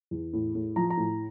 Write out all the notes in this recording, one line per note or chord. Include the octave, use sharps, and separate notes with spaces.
E2
A2
A2
F3 A#5
A#5
A2